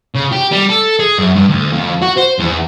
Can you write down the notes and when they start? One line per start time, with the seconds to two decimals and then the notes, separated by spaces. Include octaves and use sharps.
0.15 C#3
0.32 G4
0.52 G3
0.69 A4
0.99 G#4
1.18 F#2
1.35 G2
1.49 D2
1.73 F2
2.02 F#4
2.17 C5
2.39 E2